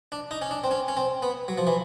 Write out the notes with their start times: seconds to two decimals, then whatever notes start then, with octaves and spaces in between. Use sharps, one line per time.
0.12 D4
0.31 D#4
0.42 C#4
0.51 D4
0.64 C4
0.71 C#4
0.88 C#4
0.97 C4
1.22 B3
1.48 F#3
1.58 F3
1.67 E3